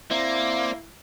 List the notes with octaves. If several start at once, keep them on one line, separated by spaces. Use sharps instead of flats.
A#3 C4 E4 C5 D5